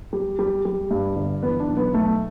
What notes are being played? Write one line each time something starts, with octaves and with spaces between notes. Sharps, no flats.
G3
G3
G3
G2
G1
E3 B3
D4
B1
B3
B1 A3